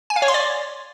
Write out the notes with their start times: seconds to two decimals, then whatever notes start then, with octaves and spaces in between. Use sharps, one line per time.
0.10 G#5
0.16 F5
0.22 C#5
0.28 C6
0.34 D5